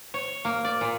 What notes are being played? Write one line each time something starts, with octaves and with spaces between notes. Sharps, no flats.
C#5
A#3
D5
A#2